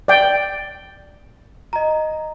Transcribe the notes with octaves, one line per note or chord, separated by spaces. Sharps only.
D5 G5
D#5 A#5